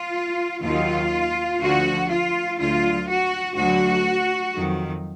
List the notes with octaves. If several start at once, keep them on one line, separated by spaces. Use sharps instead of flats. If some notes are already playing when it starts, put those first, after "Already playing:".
Already playing: F4
D#2 D#3 F#3 F4
D2 D3 F3 F#4
F4
D2 D3 F#3 F4
F#4
D2 D3 F#3 F#4
F2 D#3 F#3